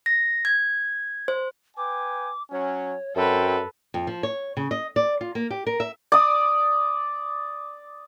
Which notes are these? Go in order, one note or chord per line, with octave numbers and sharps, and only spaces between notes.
A#6
G#6
C5
B4 G5 G#5 D6
F#3 C#4 C#5
F#2 F#3 C4 A4 B4 C5 G5
F2
F3
C#5
C#3
D#5
D5
F4
A#3
G4
A#4
E5
D5 D#6